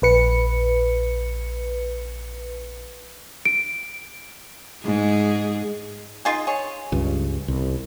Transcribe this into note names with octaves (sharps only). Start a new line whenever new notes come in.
A#1 B4 C#7
D7
G#2 G#4
D#4 F4 G#4
G#4 C#5
C#2 G2
C2